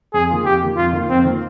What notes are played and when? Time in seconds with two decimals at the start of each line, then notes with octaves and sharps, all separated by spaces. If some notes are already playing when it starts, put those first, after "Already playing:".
0.13 F2 G#4
0.30 D#3 A#3 F4
0.45 F2 G4
0.61 D#3 A#3 F4
0.77 F2 F4
0.93 D#3 A#3 F4
1.09 F2 C4
1.25 D#3 A#3 F4